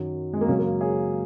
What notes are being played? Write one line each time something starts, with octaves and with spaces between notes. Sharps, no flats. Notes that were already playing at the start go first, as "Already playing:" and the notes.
Already playing: F#2 D#3 F#3
G#3
A#3
F#2 C#3 F#3 G#3 C#4
A#3
G#4 C#5